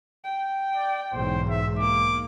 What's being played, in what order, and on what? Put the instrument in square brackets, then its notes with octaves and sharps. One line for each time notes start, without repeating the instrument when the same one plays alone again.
[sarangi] G5
[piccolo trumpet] D5
[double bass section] B1 E2 G#2 [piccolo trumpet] C5
[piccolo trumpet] E5
[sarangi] A#3 [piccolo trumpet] D6